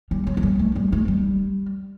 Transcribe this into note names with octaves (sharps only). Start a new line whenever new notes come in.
G3
F#3
F#3
G3
A3
G3
A3
G3